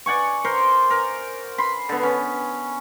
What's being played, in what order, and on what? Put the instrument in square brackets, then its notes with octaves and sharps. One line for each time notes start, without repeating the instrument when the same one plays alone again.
[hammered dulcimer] D5 F#5 G#5 C#6
A#4 C5 C6
A#4
B5 C6
D3 B3
C#4